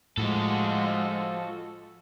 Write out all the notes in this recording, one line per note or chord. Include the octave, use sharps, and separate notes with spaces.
A2 F3 G#3 F#4 A4